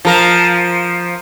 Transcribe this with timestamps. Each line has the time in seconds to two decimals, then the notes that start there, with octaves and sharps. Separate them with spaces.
0.05 F3 A#4